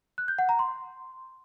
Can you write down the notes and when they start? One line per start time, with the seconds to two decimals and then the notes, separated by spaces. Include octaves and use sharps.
0.18 F#6
0.28 G6
0.39 F#5
0.49 A#5
0.59 C6